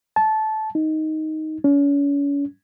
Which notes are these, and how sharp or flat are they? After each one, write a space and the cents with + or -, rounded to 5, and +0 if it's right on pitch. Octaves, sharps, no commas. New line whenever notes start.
A5 -15
D#4 +5
C#4 +35